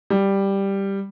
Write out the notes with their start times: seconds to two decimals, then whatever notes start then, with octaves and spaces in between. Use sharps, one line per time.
0.10 G3